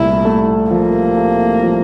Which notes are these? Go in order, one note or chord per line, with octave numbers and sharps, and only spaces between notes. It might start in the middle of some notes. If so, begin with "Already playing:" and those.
Already playing: C2 A#2 A3 E4
A3
F3 A#3
A3
F3